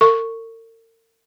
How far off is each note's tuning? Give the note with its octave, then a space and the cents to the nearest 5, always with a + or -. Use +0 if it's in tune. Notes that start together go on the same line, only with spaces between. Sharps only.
A#4 -45 C#6 +0